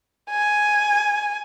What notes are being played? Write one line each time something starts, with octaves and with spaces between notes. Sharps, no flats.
G#5